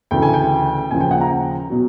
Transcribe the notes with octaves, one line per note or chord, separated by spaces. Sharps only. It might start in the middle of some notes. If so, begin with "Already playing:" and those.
D2 C#3 E3 A3 G5
G#5
G5
D#2 C#3 F3 G#5
G5
F#5
A#5
B2 F#3